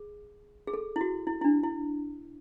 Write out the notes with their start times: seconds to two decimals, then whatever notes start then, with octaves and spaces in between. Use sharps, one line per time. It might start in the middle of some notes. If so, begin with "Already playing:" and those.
Already playing: G#4
0.67 G#4
0.74 A4
0.96 E4
1.01 F#4
1.27 E4
1.41 E4
1.44 D4
1.63 E4